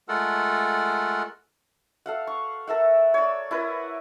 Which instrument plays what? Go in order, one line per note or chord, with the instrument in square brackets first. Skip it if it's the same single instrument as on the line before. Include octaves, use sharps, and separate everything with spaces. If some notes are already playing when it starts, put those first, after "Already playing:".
[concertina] G#3 A3 F4 A4 A#4 F#5
[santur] A4 F5 F#5
C#6
A4 A#4 E5 F#5
C#5 D5
E4 A#4 B4